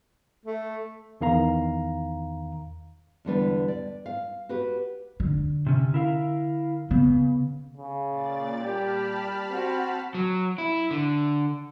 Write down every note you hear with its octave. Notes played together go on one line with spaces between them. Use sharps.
A3
E2 D#3 F5 A#5
E2 D3 G3 B4
D5
F5
F#4 G4 B4
D3
C3 C#4
E4 A#4 F5
C#3 B3
C#3
A#2 D5 A6
G3 G4 A5 B5 F6
C4 F#4
F#3
E4
D3